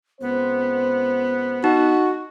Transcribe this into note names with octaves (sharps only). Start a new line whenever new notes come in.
C#2 B3 C4 C5
D#4 F#4